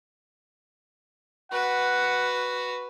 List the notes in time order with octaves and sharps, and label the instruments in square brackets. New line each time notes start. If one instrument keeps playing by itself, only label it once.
[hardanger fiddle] F#4 B4 [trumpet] F#5